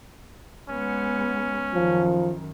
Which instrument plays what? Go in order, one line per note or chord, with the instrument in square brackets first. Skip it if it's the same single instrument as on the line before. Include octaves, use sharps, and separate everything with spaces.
[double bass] G#3 B3 [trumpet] C#4
[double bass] F#2 D#3 [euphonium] F3